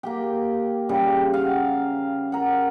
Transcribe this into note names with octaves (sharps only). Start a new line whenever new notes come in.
A#3 G4 G5
C#3 G3
F5 F#5
A#4 F#5